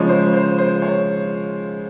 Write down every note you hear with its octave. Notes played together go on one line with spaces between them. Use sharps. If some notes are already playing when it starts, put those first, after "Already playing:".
Already playing: C#3 F3 G#3 C#5
C5
C5
C5
C#5